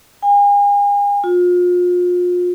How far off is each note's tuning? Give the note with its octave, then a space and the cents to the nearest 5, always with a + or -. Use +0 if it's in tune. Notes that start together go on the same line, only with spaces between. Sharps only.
G#5 -40
F4 +35